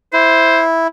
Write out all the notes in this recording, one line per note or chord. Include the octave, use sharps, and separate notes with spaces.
E4 C5